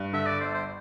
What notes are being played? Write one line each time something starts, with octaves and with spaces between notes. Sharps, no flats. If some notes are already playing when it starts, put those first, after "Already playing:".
Already playing: G2
D3 E5
D5
G1 C5
C5